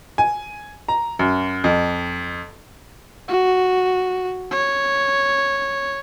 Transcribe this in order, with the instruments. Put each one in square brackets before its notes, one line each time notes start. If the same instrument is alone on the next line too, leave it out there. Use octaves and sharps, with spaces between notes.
[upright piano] G#5
A#5
F#2
F2
[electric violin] F#4
C#5